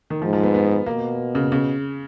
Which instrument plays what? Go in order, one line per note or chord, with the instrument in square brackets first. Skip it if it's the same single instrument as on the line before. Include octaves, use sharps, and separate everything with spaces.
[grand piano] D#3
[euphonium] G#2 [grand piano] F3
[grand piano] F3
B3
B3
[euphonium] B2 [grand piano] A#3
[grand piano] C#3
C#3